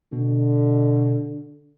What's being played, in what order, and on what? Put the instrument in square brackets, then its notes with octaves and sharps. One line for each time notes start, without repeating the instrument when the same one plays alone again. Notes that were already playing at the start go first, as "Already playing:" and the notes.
[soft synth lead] B2 [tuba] D3